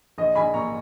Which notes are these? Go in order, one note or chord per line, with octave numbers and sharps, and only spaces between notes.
A#1 D#5
A#1 G#5 B5
A#2 A#5 C#6